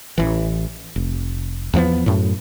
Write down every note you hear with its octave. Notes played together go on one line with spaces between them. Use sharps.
A1 E3
F1
E2 F3 A3 B3
F#2 A2